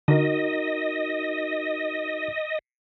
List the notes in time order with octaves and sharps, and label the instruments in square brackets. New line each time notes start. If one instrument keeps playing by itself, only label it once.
[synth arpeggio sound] D3 [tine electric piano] D#4 F#4 A#4 [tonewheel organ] D#5